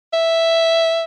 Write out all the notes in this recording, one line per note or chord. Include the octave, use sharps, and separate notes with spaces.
E5